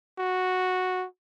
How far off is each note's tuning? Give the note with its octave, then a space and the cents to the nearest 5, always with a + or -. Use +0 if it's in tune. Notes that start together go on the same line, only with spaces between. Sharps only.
F#4 -5